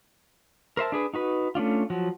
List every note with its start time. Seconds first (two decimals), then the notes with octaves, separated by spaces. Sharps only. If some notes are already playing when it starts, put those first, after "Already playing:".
0.77 A#4 C5 E5 A5
0.92 D4 G#4 B4
1.14 D#4 F#4 B4
1.55 A3 C#4 D4 F4
1.90 F3 F#3 F#4